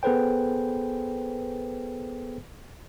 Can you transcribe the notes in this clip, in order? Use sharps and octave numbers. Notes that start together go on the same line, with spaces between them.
B3 G#4 A4 B4 C5 G5